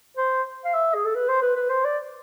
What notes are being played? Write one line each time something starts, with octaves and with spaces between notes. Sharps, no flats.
C5
F5
E5
G#4
A4
B4
C5
B4
B4
C5
D5